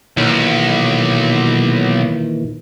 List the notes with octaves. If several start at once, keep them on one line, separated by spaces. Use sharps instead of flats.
B1 A#2 D#3 E3